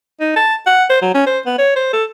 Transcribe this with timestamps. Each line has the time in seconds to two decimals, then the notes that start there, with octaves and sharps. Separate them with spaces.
0.20 D#4
0.36 A5
0.66 F#5
0.90 C5
1.02 F#3
1.14 C#4
1.26 C5
1.46 B3
1.58 C#5
1.76 C5
1.93 A4